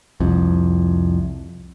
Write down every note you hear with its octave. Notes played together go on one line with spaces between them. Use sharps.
C2 F2